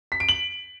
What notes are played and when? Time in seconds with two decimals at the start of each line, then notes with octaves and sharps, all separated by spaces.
0.12 B6
0.20 D7
0.29 F#7